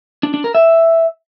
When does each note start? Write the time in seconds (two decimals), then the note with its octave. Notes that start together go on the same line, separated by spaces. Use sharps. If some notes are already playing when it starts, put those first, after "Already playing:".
0.23 D4
0.34 D4
0.44 A#4
0.55 E5